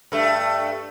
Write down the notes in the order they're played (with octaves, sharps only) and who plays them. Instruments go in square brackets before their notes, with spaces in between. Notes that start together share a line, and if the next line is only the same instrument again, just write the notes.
[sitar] G2 A3